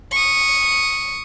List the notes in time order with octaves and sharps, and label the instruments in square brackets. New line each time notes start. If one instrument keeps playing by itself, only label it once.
[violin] C#6 D#6